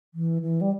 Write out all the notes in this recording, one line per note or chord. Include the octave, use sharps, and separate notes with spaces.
E3
E3
G3